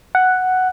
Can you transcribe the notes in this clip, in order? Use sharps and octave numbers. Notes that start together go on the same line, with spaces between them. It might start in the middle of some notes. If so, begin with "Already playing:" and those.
F#5